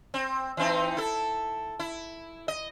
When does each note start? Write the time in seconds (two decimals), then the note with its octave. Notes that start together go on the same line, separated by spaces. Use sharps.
0.14 C4
0.57 E3 C4 D#4
0.97 E4 A4
1.79 E4
2.48 D#5